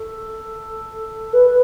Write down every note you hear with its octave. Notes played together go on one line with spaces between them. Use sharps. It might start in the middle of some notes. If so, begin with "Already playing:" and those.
Already playing: A4
B4